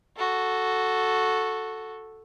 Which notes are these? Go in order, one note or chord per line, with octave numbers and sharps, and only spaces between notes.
F#4 A4